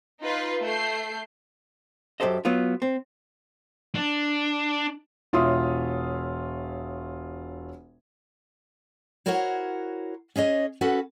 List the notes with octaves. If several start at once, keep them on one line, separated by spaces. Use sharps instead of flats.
D#4 F4 B4
A3 G6 C7
F#2 C3 G4 A4 C5 D#5
F#3 B3 F4
C4
D4
E1 F4 C#5 E5 C6 D#6
E4 F#4 A#4 C5 C#5 F#5
C#4 G#4 C#5 D#5
C#4 F#4 A4 B4 F#5